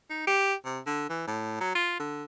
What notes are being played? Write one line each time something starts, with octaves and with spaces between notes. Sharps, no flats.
D#4
G4
C3
D3
E3
A2
F#3
F4
D3